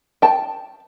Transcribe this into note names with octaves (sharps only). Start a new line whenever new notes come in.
G5 A5